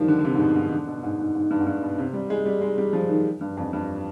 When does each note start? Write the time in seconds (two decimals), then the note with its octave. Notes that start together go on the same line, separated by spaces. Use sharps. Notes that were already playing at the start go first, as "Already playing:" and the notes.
Already playing: D#3 F3 G3
0.08 D3
0.19 D3
0.25 C3
0.35 G#2
0.39 B2
0.56 G#2
0.72 D3
0.87 B2
1.03 G#2
1.19 G#2
1.35 G#2
1.51 G2
1.60 G#2
1.67 G2
1.82 B2
1.98 C3
2.13 G3
2.30 G#3
2.46 G3
2.61 G#3
2.78 G3
2.93 F3
3.09 D#3
3.41 G2
3.57 F2
3.73 G2